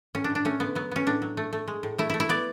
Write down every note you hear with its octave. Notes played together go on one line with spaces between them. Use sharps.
A2 C#4
D4
A2
D4
A3 C#4
D3 B3
F#3 B3
B3 C#4
A2 D4
F#3
A3
A3
G#3
A2
A3 E4
A3 E4
E4
B3 D5